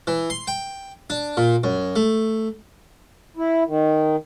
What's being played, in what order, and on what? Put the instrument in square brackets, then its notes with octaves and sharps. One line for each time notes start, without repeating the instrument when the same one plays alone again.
[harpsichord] E3
C6
G5
D4
A#2
F#2
A3
[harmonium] E4
D#3